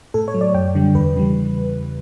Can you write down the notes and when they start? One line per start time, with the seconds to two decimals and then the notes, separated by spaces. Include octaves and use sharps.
0.14 A2 A4
0.28 C#5
0.34 F#3
0.41 D5
0.54 F#2 G5
0.75 D3 G3
0.94 E2 B4
1.15 C#3 E3 G3